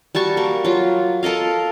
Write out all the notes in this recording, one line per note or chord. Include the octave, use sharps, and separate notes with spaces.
G3 F#4 A5 C#6
A#3
F#3 F4
A4 A#4 D#5 F5